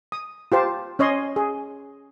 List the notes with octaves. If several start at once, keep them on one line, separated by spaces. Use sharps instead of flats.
D#6
F4 G4 C5 A5
C#4 C#5 D#5 C6
G#4